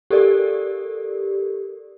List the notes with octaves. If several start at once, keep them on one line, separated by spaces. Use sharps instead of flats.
G4 A4 A#4 D5